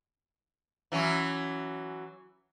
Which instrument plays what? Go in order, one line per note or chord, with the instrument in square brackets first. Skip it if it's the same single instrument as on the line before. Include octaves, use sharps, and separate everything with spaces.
[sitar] E3 F#3 C#4